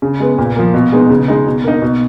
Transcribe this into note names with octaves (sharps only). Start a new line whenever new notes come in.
C#3
G#3 B3
A#2
F3 A#3
B2
G#3 B3 D#4
C#3
G#3 D#4
B2
A#3 D#4
B2